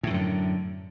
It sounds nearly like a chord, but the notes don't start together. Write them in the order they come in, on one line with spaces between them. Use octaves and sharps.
A2 D#3 F#2 D3